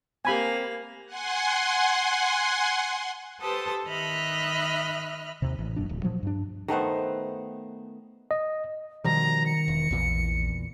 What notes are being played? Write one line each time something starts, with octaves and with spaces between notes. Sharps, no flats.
A#3 C4 G4 F5 G#5 B5
F#5 G#5 C6
G4 A4 B4 C5 A5 D#6
D#3 D#5 E5 B5 F6 F#6
D#2 C3
A1
E1 F#2 A#2 D4
D1
A#2 F3 F#3
G2 D4
D#3 A3 B3 C5
D#5
B2 D#3 F3 G3 A#5
C#7
E1
A#1 E2 A#2 E3